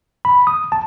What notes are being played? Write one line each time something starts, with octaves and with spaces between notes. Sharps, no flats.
B5
D#6
A5